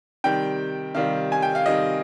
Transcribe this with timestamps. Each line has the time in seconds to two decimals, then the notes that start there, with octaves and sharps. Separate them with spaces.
0.24 C3 D#3 G3 G5
0.95 C3 D#3 G3 F5
1.32 G#5
1.42 G5
1.55 F5
1.66 C3 D#3 G3 D#5